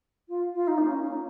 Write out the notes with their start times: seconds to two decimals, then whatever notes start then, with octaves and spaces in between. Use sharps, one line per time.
0.28 F4
0.54 F4
0.67 D#4
0.78 A#3
0.87 C#4
0.98 C#4
1.07 A#3